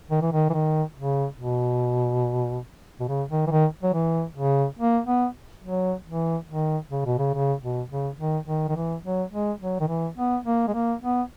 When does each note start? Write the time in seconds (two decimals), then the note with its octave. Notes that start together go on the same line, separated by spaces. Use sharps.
0.11 D#3
0.22 E3
0.33 D#3
0.50 E3
0.53 D#3
0.96 C#3
1.38 B2
3.00 B2
3.08 C#3
3.30 D#3
3.47 E3
3.51 D#3
3.83 F#3
3.94 E3
4.36 C#3
4.79 A#3
5.06 B3
5.64 F#3
6.07 E3
6.48 D#3
6.91 C#3
7.05 B2
7.19 C#3
7.34 C#3
7.62 B2
7.90 C#3
8.19 D#3
8.47 D#3
8.69 D#3
8.76 E3
9.03 F#3
9.32 G#3
9.61 F#3
9.80 D#3
9.88 E3
10.17 B3
10.44 A#3
10.68 G#3
10.74 A#3
11.02 B3